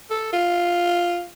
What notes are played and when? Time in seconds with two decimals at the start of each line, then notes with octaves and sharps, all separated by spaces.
0.10 A4
0.33 F4